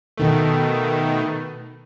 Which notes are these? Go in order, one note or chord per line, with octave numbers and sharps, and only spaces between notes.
B2 D#3 A3